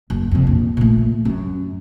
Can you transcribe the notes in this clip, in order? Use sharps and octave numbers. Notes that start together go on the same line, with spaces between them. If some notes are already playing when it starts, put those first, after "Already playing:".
F#1 F#2
F2 C3
A#1
A#2 A3
F#2